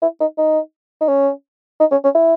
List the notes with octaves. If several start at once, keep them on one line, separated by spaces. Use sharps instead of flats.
E4
D#4
D#4
D#4
C#4
D#4
C#4
C#4
E4